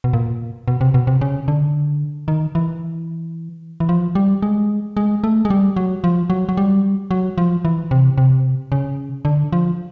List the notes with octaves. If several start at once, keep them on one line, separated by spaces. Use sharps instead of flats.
B2
A#2
B2
C3
B2
C3
C#3
D3
D#3
E3
E3
F3
G3
G#3
G#3
A3
G#3
G3
F#3
F3
F#3
F#3
G3
F#3
F3
E3
C3
C3
C#3
D3
F3